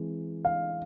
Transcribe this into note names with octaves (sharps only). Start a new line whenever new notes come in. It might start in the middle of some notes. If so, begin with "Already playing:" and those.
Already playing: E3 G#3 C4
F5